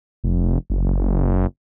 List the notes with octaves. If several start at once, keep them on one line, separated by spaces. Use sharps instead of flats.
F1
F#1